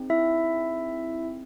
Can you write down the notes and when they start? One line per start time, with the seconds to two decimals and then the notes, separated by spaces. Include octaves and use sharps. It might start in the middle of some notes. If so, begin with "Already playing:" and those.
Already playing: C4 D#4 G#4
0.10 E4 E5